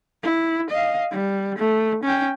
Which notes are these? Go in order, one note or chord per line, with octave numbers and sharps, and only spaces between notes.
E4
D#5 F5
G3
A3
C#4 G5